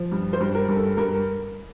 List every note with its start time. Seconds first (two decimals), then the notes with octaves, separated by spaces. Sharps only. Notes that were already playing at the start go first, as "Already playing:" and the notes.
Already playing: F3
0.12 G2
0.33 C5
0.40 G2
0.55 A#4
0.68 G2
0.77 A4
0.97 G2 A#4